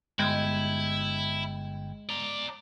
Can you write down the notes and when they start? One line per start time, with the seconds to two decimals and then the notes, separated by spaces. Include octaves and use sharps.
0.19 G1 G#3 E4 G5 G#6
2.09 D5 A#5